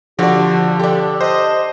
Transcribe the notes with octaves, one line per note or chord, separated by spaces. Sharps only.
D3 F3 D4 F#4 G4
D4 G4 A4
C5 D#5